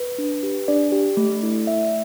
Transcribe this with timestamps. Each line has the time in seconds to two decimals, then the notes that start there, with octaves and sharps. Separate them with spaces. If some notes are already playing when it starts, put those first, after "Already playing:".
Already playing: B4
0.18 D4
0.43 G4
0.68 D4 D5
0.92 G4
1.17 A3
1.43 E4 A4
1.67 A3 E5